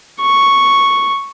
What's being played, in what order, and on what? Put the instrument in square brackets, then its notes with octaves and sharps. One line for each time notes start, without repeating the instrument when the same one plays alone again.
[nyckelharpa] C#6